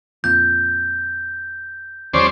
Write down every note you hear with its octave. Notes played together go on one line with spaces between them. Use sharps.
F2 A#2 G6
E2 F3 G3 C#4 C5 D5